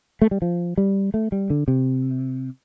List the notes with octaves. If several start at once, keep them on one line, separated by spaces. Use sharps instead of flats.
A3
G3
F3
G3
A3
G3
D3
C3